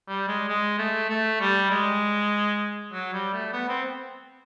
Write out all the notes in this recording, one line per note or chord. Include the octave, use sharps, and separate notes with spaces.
G3
G#3
G#3
A3
A3
G3
G#3
F#3
G3
A3
B3
C4